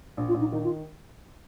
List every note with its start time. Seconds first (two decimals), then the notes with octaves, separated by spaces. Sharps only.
0.17 A#1
0.29 F4
0.34 A#1
0.40 D#4
0.52 D#3 D#4
0.64 F4